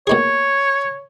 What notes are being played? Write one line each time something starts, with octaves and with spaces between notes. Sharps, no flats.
B2 A#3 D#4 G#4 C#5